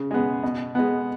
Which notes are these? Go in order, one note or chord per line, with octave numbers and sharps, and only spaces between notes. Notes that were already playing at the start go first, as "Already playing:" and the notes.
Already playing: C#3
G#3 B3
B2
G#3 B3